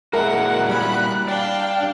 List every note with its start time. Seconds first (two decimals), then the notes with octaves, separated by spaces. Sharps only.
0.13 A#2 G#3 E4 F#4 A#4 E5 F#5
0.69 G3 G#5 B5 F#6
1.28 D4 D5 F5 G5